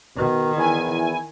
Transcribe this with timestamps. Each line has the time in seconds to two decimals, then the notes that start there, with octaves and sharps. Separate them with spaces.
0.17 B2 D#3
0.55 E2 E4 G#5